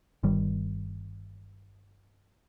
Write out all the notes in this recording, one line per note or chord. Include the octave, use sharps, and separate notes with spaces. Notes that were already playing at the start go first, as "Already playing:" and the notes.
G1 D#3 G3